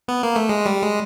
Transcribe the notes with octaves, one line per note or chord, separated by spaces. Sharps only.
B3
A#3
A3
G#3
G3
G#3